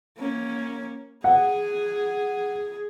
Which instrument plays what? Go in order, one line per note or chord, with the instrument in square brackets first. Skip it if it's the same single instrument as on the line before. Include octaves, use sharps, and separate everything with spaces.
[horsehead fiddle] A#3 C#4
[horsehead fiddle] G#4 [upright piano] F#5